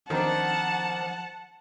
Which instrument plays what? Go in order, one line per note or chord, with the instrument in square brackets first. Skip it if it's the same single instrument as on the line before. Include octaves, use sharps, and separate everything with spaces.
[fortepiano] D#3 C4 D4 [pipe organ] F3 [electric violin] F#5 A5